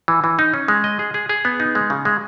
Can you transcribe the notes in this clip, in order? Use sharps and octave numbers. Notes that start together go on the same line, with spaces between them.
E3
E3
D#4
C#4
G#3
D#5
G#4
G#4
G#4
B3
D#4
G#3
C#3
G#3